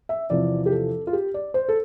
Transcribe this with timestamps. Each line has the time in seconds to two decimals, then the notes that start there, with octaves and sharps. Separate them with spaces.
0.09 E5
0.30 E2 C3 F3 D5
0.66 G4
0.72 A4
1.07 F4
1.13 G4
1.34 D5
1.54 C5
1.69 A4